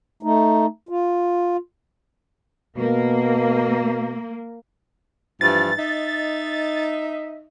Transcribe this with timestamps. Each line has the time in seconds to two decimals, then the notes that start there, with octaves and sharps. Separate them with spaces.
0.23 A3 D#4
0.89 F4
2.78 B2 A#3
5.41 G2 E3 F3 A6
5.78 D#4 D#5 E5